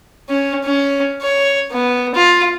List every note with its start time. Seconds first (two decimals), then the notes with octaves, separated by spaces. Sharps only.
0.29 C#4
0.65 C#4
1.22 C#5
1.72 B3
2.14 F4